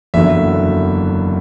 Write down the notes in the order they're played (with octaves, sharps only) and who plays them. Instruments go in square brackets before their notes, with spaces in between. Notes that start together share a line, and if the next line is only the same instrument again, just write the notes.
[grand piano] F#1 E2 D3 F#3 E5